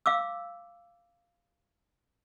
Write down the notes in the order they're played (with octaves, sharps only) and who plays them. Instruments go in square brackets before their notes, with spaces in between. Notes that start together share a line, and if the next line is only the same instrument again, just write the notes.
[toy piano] F5 D6 E6